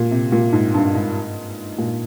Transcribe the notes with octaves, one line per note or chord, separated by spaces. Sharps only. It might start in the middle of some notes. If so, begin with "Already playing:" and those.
Already playing: A#2
C3
A#2
G#2
G2
G#2
A#2